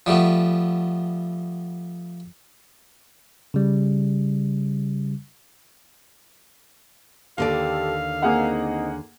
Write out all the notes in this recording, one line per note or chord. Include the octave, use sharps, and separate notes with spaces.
F3 G3 A3 B3
C#3 G3
D#2 D3 G4 A4 D5 F5
A#3 C4 D#4 G#4 F#5